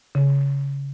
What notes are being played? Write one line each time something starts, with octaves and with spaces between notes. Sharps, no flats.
C#3